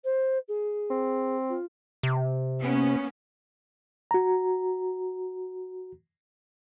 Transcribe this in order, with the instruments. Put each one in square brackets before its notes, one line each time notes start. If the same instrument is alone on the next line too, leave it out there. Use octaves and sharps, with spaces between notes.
[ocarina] C5
G#4
[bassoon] C4
[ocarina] F4
[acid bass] C3
[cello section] A#3 B3 C#4
[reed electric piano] F#4 A#5